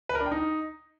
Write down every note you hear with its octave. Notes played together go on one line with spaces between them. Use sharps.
B4
A#4
D4
G5
D#4